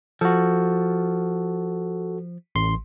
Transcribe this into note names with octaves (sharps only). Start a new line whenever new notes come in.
F3 F#4 A4
A1 C6